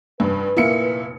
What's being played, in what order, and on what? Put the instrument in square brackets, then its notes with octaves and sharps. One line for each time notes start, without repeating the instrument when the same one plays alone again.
[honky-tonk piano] F1 G2 [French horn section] B4
[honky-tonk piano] F1 C#7 [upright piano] A#2 A#3 E4